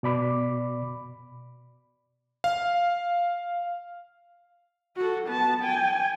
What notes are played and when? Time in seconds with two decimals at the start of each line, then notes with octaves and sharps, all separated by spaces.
0.03 B2 D5 B5 D6
2.44 F5
4.97 F#4 A4
5.27 B3 A5
5.62 G5 G#5